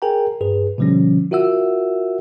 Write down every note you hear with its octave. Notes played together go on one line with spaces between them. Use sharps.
G#4 A#4 G5 G#5 A#5
G2 G#4 B4
B2 D3 F3 G3 C#4
F4 F#4 A#4 E5 F#5 E6